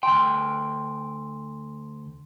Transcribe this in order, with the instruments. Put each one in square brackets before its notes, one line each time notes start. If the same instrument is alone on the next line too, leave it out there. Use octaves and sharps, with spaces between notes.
[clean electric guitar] D2 G5 [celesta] C6